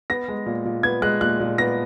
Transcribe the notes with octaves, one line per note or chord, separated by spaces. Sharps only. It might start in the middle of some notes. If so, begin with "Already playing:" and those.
B3 A#6
G#3
A#2
A#2
B3 G#6
G#3 F#6
A#2 F#6
A#2
B3 A#6